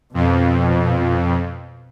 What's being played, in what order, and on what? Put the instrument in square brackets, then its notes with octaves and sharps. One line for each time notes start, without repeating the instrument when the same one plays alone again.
[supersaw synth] F2 [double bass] B2